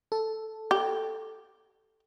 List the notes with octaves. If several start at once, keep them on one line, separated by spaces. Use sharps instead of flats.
A4
G4